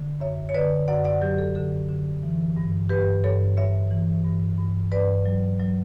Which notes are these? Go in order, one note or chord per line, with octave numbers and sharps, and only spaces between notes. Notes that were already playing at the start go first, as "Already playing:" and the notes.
Already playing: D3
F#2 C#5 E5
C#5
D3 B4 D5
F#2 D5 F#5
D5 F#5
F#3 G4
A4
D3 A4
D3
E3
G2
G2 G4 B4
G2 A4 C#5
G2 C#5 E5
E3
G2
G2
G2 B4 D5
F#3
F#3